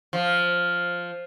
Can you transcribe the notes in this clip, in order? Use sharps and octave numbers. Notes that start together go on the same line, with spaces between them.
F3